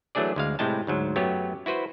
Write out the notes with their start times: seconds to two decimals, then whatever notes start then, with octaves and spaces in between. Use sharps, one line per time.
0.15 E3 F#3 A3 D4 G#4 D5
0.36 D2 G#3 F5
0.59 A2 C3 G#3 E4 G5 A5
0.87 D2 G#2 F#3
1.16 F#2 F#3 A3 B3 G4 C#5
1.66 E4 F#4 B4 C5